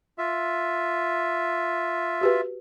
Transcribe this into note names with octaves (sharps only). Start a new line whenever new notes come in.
F4 E5
F#4 G4 B4